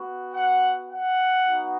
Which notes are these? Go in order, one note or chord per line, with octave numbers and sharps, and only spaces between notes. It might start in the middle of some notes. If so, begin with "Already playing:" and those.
Already playing: B3 F#4
F#5
F#5
B3 D#4 F#4